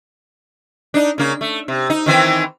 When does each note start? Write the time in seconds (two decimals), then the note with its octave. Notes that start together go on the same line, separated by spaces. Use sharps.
0.94 D4 D#4
1.18 C#3 A#3
1.41 A3
1.68 C3
1.90 D#4
2.06 D#3 E3 C4